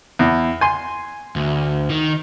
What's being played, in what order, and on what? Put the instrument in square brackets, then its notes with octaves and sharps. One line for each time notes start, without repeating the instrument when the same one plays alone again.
[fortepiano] E2
G#5 C6
[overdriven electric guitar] D2
D#3